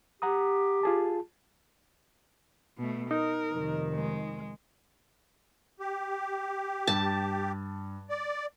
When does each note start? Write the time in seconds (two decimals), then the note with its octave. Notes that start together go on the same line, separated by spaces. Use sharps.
0.22 G4 F#5 A#5 D#6
0.83 F4 G#4 A5
2.78 B2 A3
3.11 D#4 A#4
3.52 F1 D#3
3.94 G#3
5.80 G4
6.87 G2 A5
8.09 D5